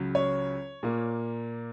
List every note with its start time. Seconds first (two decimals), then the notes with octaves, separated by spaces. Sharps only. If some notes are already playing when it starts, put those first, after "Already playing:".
Already playing: C#2 C#3 F#3
0.15 C#5
0.83 A#2 A#3